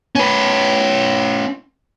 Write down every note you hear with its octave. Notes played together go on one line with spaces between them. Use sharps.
C#4 B4